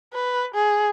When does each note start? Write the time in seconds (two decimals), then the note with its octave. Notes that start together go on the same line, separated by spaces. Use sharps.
0.13 B4
0.54 G#4